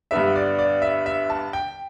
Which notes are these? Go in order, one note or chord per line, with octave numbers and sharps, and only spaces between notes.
G2 D3 B3 E5
D5
D5
E5
E5
A5
G5